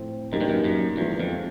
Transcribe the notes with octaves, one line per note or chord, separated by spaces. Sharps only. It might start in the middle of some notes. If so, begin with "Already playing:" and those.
Already playing: A2 F3 A3 C4
F#2 A#3 D#4 G4 A#4
G2
F#2
F#2
E2 F3 G#3 B3
F2